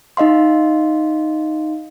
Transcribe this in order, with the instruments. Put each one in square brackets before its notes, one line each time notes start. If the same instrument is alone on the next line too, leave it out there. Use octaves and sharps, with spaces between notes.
[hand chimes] D#4 D#5 F5 C6